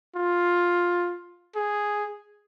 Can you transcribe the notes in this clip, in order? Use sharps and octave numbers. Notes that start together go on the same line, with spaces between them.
F4
G#4